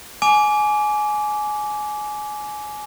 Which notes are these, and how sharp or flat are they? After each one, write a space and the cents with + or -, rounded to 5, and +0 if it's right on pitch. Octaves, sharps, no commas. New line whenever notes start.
G#5 +20 D6 -15